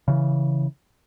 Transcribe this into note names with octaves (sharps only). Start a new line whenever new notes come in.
C#3 E3